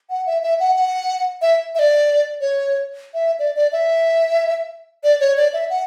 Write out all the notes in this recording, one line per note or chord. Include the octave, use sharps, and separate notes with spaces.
F#5
E5
E5
F#5
F#5
E5
E5
D5
C#5
E5
D5
D5
E5
D5
C#5
D5
E5
F#5